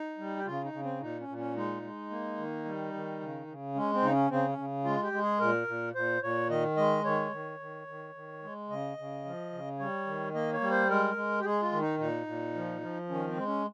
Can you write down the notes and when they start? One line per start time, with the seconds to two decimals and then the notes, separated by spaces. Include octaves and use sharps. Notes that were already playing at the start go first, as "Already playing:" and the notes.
Already playing: D#4
0.18 G3
0.37 G4
0.45 C#3 F4
0.64 D#4
0.73 C#3
0.83 C4
1.00 A#2 D#4
1.20 C#4
1.28 A#2
1.38 C#4
1.56 G#3 D#4
1.82 G#3
2.10 A#3
2.37 D#3
2.65 G3
2.93 D#3
3.21 C#3
3.47 C#3
3.75 G#3 C#4
3.93 C4
4.02 C#3 D#4
4.12 C#4
4.30 C#3 C4
4.49 C#4
4.58 C#3
4.85 G#3 F4
5.03 G4
5.12 G#3
5.22 G#4
5.40 A#2 A#4
5.67 A#2
5.95 A#2 C5
6.22 A#2 C#5
6.49 D#3 D#5
6.77 G#3 D#5
7.05 D#3 C#5
7.32 D#3
7.60 D#3
7.87 D#3
8.15 D#3
8.43 G#3
8.69 C#3 D#5
8.98 C#3
9.25 F3
9.52 C#3
9.79 G3 C#5
10.06 D#3
10.34 A#3 D#5
10.53 C#5
10.61 G3
10.71 C5
10.89 G#3 A#4
11.16 G#3
11.40 G4
11.45 G#3 G#4
11.62 F4
11.72 D#3
11.81 D#4
11.99 A#2 D#4
12.27 A#2
12.55 F3
12.81 F3
13.09 D#3 C#4
13.28 C4
13.36 G#3
13.46 C#4